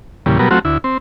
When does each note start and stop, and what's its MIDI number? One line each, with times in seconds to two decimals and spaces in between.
0.26 0.38 40
0.26 0.38 46
0.26 0.38 49
0.26 0.38 55
0.39 0.49 47
0.39 0.49 54
0.39 0.49 55
0.39 0.49 59
0.39 0.49 70
0.51 0.59 54
0.51 0.59 57
0.51 0.59 60
0.51 0.59 65
0.51 0.59 66
0.65 0.78 38
0.65 0.78 64
0.84 0.98 60